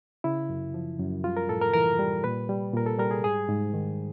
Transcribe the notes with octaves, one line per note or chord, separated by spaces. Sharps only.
C#3 E4
F#2
F3
F#2
G3 F4
A#4
A2 A4
A#4
E3 A#4
G3
A#2 B4
G3
A#2 A#4
A4
G3 A#4
G#4
G#2 G#4
G#2
D#3